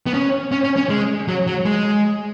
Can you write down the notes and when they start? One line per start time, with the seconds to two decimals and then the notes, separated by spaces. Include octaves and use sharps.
0.06 B3
0.14 C#4
0.52 C#4
0.64 C#4
0.77 C#4
0.89 G#3
1.28 F#3
1.47 F#3
1.66 G#3